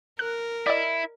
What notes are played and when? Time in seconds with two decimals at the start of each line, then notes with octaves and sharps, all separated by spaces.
0.19 A#4 F#6
0.67 E4 D5 D#5